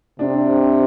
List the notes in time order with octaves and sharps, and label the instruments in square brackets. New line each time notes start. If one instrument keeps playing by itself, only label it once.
[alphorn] C3 [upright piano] D4